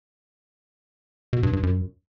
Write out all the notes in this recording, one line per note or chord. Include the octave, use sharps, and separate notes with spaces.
B2
G2
G2
F#2